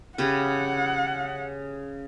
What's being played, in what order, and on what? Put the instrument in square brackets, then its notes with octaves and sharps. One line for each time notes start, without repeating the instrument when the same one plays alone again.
[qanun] C#3 G4 B4 [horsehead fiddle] F#5